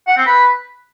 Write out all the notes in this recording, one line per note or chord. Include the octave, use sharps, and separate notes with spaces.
F#5
C4
B4